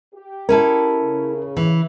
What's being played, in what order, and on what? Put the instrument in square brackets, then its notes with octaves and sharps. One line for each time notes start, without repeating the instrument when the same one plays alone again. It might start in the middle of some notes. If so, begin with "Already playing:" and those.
[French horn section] G4
[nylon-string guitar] C#4 E4 A4 [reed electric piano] A#4
[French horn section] C#3
[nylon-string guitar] E3